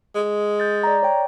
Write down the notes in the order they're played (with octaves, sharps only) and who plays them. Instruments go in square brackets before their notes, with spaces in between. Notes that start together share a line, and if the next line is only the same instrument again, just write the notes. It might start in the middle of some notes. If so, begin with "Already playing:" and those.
[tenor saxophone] G#3
[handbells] G6 A6
D5 A#5
C#5 G5